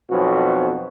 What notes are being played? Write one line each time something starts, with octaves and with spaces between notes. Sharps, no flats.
B1 F2 B2 F#4